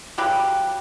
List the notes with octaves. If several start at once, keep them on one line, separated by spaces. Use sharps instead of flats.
C#3 F#3 G4 B4